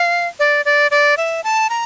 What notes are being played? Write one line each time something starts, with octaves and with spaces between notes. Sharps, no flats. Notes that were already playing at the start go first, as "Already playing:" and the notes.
Already playing: F5
D5
D5
D5
E5
A5
A#5